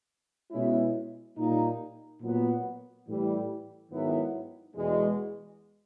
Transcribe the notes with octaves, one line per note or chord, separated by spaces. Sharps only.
B2 G#3 C#4 E4
A#2 G3 A#3 D#4
A#2 F#3 B3
A2 E3 G3
G#2 D#3 F#3 B3 E4
E2 B2 G#3